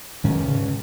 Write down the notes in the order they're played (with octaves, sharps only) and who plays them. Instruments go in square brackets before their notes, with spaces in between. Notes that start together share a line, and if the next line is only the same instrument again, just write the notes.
[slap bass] G#2 G#3 C#4 [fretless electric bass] D#3
[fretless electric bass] C#3